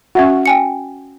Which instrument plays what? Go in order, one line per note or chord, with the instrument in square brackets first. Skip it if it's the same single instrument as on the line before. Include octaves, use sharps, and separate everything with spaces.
[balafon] C#4 E5 F#5 [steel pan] F#4
[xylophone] G5 G#5 C#7